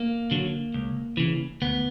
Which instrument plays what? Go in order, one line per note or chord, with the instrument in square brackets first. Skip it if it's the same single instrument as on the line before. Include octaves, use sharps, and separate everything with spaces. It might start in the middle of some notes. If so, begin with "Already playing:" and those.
Already playing: [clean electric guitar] A#3
D3 F#3
C#2
C#3 E3
D2 B3